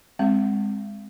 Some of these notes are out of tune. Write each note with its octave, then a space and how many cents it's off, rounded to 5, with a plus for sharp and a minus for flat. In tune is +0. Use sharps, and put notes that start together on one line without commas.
G#3 -15 C4 +0 F5 -45